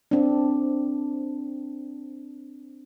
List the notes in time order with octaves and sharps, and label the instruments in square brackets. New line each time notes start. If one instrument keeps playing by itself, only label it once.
[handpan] C4 D4